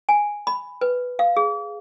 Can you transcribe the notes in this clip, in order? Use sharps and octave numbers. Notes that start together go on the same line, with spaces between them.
G#5
B5
B4
F5
G#4